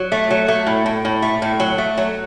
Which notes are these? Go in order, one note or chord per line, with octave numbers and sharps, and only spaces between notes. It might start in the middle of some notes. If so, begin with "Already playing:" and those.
Already playing: F#3
A3
F#3
A3
A2
A2
A2
A3
A2
F#3
A3
F#3